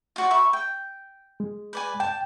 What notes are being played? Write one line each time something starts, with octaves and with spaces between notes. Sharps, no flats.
F4 F#4 D5
E5 B5 C#6
G5
G#3
B4 D5 G#5
G5 A5